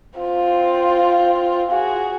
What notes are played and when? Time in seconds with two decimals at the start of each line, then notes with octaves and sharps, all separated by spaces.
0.19 C4 F4
1.71 F#4 G#4